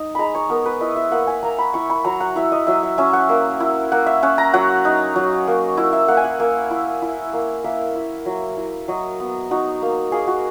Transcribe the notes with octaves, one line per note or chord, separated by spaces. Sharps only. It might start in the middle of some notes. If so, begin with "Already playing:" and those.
Already playing: D#4
G#3 A#5 B5
C#5
B3 A#4
B4
E4 D#5
E5
A#3 F#5
G#5
A#3 A#5
B5
E4 C#6
B5
F#3 A#5
F#5
E4 E5
D#5
F#3 E5
E5
C#4 E5
F#5
A#3
E4
A#3 F#5
E5
C#4 F#5
A#5
F#3 F#5
D#4
F#3
A#3
E4
E5
A#3 F#5
G#5
F#5
A#3
E4
E4
A#3
A#3 E5
E4
F#3
E4
F#3 D#5
B3
D#4 F#4
A#3
A#3 G#4
F#4